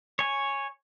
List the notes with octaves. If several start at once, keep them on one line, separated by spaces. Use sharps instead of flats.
C#5 G#5